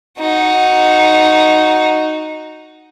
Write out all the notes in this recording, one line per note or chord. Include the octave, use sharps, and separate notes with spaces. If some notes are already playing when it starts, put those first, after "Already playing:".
D#4 F#4